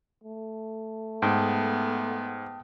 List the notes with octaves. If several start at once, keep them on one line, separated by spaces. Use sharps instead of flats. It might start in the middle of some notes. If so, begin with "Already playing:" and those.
A3
G#2 B3 G5 A5 D#6